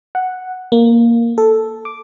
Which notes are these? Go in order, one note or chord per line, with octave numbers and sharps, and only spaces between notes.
F#5
A#3
A4
D6